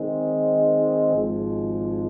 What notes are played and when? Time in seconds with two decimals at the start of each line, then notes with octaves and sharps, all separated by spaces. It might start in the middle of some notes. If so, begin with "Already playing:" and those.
Already playing: D#3 G#3 C4
1.13 G#1 G#2 F3 G#3